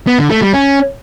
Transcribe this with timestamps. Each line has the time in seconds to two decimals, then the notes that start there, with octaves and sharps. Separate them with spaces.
0.07 B3
0.19 D3
0.30 A3
0.42 G3
0.54 C#4